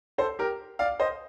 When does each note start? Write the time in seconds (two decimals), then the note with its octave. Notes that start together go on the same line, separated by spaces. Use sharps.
0.18 A4 C5
0.39 G4 A#4
0.79 D5 F5
1.00 C5 D#5